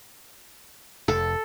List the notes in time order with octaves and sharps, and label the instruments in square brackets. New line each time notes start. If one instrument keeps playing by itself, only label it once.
[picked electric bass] F1 [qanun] A4